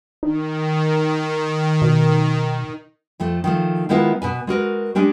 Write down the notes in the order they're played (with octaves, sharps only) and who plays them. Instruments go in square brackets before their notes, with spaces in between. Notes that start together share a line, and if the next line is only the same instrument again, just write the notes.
[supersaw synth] D#3 [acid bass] D#4
[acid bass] B2
[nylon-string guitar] F2 F3 A3
D#3 F3 A3
D#3 G#3 B3 E4 F4 B4
B2 B4 G#5
G#3 F#4 A#4 B4
G#3 C#4 D4 G4